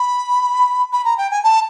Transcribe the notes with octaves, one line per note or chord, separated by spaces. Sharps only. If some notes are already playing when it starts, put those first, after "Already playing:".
Already playing: B5
B5
A#5
G5
G#5
A5